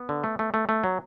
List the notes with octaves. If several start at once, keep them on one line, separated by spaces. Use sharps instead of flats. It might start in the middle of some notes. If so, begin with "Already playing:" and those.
Already playing: B3
D3
A3
A3
A3
A3
F#3